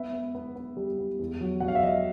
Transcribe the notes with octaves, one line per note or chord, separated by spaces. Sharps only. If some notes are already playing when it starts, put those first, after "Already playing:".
Already playing: B3 E5
B3
B3
B3
G3
B3
E2
F#3
F#3 F#5
F5
E5
F#3 D#5